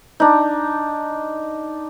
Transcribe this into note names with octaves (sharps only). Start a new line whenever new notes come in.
D4 D#4